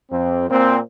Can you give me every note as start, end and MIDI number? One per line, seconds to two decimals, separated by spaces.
0.11 0.49 41
0.11 0.49 60
0.50 0.79 46
0.50 0.79 60